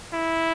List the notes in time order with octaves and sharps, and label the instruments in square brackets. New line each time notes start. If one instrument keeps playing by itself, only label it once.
[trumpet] E4